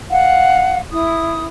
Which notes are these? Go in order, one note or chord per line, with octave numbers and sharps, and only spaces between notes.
F5 F#5
E4 D#6